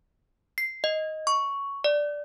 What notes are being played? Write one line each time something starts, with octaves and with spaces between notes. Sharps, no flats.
C7
D#5
C#6
D5